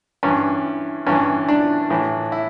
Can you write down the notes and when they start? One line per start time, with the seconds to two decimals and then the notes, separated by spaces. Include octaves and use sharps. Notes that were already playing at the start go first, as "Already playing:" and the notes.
0.23 G2 E3 C#4
1.07 G2 E3 C#4
1.49 D4
1.90 A2 E3
2.32 E4